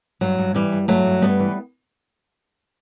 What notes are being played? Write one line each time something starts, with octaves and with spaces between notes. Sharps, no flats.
G2 F#3
G2
E3 G3
G2
G2 F#3 A3
G2
G2 G3 B3
E3